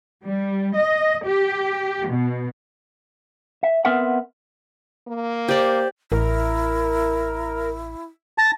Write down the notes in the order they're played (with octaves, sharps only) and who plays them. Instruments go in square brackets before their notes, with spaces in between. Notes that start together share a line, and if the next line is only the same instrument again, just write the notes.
[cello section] G3
D#5
G4
B2
[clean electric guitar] E5
B3 C4 A#4 B4 E5 F#5
[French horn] A#3
[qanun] G4 D5 [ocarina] C5
[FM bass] A1 [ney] E4 [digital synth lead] A#4
[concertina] A5 [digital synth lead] A#6